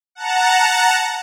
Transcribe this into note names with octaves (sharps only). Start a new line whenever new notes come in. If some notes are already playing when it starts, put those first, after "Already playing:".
F#5 A5 A#5